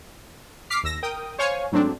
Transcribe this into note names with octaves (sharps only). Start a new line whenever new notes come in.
D6 F6 B6 C7
D#2 E6 A#6
A#4 G5 D#6
C5 C#5 F5 G#5 C#6
G#2 F#3 A3 C4 D4